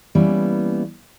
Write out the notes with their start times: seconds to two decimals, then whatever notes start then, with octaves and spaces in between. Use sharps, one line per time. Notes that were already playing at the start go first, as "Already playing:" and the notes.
0.15 E3 G3 A#3 B3 C#4 E4